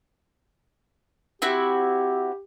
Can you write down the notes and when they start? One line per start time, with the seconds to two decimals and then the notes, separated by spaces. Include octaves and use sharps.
1.42 C4 E4 F#4 G4